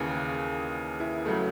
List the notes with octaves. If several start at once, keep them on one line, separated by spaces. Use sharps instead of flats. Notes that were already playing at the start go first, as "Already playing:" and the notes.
Already playing: D#2 C#3 E3 G#4
E4
C#3 F#3 A3